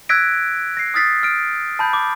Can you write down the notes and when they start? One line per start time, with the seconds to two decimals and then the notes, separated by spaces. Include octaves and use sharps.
0.09 E6 F#6 G#6 A#6 B6 D7
0.77 A#6 C7
0.94 D#6 F6 A6 B6 C7
1.23 F6 D7
1.79 A5 B5 G6
1.93 D6